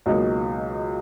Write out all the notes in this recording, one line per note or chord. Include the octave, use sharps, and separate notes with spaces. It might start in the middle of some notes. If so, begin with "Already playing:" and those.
C#2 B2 F#3 A#3 D#4